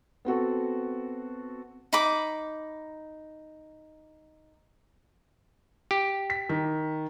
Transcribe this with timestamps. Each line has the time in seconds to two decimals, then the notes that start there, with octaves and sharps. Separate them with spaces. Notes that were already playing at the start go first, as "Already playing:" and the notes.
0.25 B3 C4 F#4 A4
1.93 D#4 B5 D6
5.91 G4
6.30 B6
6.49 D#3